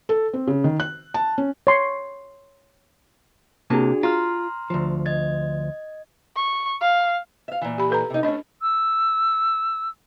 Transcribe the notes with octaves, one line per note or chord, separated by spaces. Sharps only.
A4
C4
C#3
D#3
F#6
A5
C#4
C#5 C6 C#6
C3 A#3 D4 F#4 G#4 A5
F4 A#5 C6 F6
D2 F3
D#5 G#6 A6
C#6
F5
E5 F5
A#2 E3
G4 B5
A4 B4 A#5
C3 D#4
A3 C#4 D4 D#5
E6